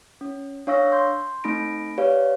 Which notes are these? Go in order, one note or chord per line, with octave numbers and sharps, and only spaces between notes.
C#4
D4 C#5 F5 C#6 E6 A#6
C6 G6
A3 C4 D#4 B5 A#6 D7
G4 B4 C#5 D5 F5